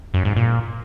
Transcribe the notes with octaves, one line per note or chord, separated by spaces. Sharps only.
F#2
G#2
A#2